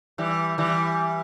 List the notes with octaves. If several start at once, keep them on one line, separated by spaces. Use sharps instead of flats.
E3 G3
E3 G3